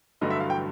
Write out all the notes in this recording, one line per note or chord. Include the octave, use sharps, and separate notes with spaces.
A1 G2 D3 F#3 A3 D#5
E5
F5
G5